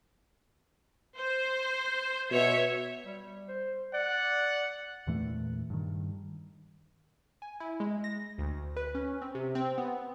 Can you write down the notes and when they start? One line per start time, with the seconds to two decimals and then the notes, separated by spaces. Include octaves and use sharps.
1.16 C5
2.31 B2 C#5 E5
3.06 G3
3.49 C5
3.94 D5 F#5
5.07 E2 A#2 E3 A3
5.70 G2 D#3
7.42 G#5
7.60 E4
7.80 G#3
8.04 A#6
8.38 D2
8.77 B4
8.95 C#4
9.22 C4
9.35 C3
9.55 C4
9.78 B3